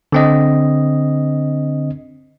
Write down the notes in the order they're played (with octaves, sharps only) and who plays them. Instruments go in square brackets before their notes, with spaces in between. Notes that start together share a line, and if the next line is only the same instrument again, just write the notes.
[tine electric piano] D3 C4 D#5